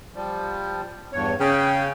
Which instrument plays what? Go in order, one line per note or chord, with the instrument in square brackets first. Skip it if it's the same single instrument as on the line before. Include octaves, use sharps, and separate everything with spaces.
[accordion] F3 G3
E2 G2 C#5
[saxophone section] C#3 [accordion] G5